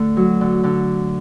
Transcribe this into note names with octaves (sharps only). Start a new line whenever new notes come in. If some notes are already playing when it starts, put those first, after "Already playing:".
Already playing: D3 A3
F#3
D3
D3